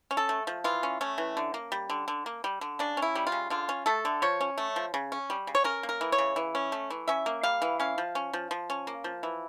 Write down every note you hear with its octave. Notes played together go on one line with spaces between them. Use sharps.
C#4
A4
A3
F3
E3 F4
C#4
A3 C#4
E3
D3
A#3
G3
D3
D3
A#3
G3
D3
C#3 D4
C#4
E4
G3
F4
C#3
D3 F4
C#4
A3 A4
D3
F3 C#5
C#4
A3
F3
C#3
C#4
G3
C#3
C#5
C#4 A#4
A#3
A#4
E3
C#5
C#3
E3
C#4
A3
E3
C#4 E5
A#3
G3 F5
E3
C#4 F5
F3
C#4
F3
F3
C#4
A#3
F3
E3